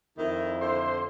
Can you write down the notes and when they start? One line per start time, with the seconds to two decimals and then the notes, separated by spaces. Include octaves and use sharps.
0.18 F2 D#3 E4
0.61 D3 C5